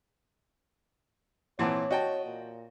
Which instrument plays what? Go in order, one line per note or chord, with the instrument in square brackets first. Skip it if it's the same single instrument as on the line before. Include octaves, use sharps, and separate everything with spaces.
[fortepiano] A#2 E3 C4 [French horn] C#5 [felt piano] F#5 A5 D6
[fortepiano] F#4 G5 A5 [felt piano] D#5
[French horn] A#2